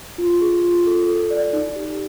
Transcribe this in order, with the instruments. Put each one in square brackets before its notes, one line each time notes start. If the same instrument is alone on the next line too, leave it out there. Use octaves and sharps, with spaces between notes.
[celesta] F4
G#4
F4
A4
A4
D5
D#4
G4